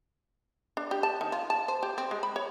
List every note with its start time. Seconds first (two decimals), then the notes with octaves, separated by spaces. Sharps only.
0.77 D4
0.91 G4
1.03 A5
1.21 D#3
1.32 F4
1.50 A5
1.68 C5
1.83 G4
1.98 C4
2.11 G#3
2.23 B5
2.36 C#5